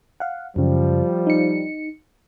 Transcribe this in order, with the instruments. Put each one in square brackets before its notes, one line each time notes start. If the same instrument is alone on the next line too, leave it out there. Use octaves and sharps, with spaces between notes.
[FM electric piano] F5 F#5
[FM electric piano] F#2 C#3 [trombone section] F3 G3
[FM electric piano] D#4 C#7